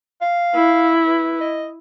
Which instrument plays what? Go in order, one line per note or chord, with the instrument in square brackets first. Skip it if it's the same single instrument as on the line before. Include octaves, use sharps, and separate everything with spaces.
[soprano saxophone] F5
[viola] E4
[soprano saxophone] B4
D#5